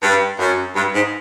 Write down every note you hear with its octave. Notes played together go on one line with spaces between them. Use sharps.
G2
F#2
G2
G#2